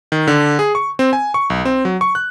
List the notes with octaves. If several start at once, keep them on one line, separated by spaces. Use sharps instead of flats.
D#3
D3
G#4
C#6
C4
G#5
C#6
B1
C4
F#3
C#6
F#6